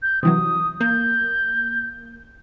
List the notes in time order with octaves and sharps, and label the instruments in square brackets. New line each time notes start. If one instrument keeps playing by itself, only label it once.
[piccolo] G6
[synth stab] C3 E3 F#3 [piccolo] D#6
[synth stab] A#3 [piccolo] G6